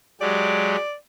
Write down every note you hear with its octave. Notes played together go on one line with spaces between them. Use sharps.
F#3 G#3 G4 D5